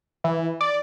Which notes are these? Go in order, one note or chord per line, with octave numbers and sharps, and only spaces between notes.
E3
D5